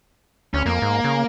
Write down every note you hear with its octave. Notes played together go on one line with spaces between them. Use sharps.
D2 C#4
F2 A#3
G#2
C#3